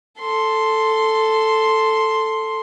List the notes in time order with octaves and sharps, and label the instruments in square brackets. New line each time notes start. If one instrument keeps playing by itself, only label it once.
[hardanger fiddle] A4 C6